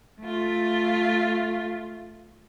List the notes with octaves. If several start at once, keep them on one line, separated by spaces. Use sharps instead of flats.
A3 F4